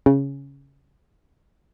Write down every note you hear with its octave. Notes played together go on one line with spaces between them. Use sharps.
C#3